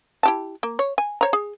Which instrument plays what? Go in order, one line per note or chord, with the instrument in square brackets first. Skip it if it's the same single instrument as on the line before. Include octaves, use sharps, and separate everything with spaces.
[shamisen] E4 G4 A5
A#3
C#5
G#5
C5 C#5 A#5
G#4